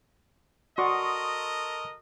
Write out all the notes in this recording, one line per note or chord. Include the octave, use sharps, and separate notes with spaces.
F#4 A4 A#4 D5 D#5 C6 C#6 D#6